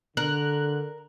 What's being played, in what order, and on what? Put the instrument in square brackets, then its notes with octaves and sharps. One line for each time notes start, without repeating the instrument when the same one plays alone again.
[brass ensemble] D3 [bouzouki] A#4 [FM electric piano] F#6